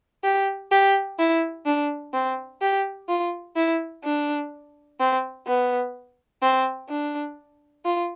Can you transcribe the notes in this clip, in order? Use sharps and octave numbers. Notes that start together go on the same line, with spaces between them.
G4
G4
E4
D4
C4
G4
F4
E4
D4
C4
B3
C4
D4
F4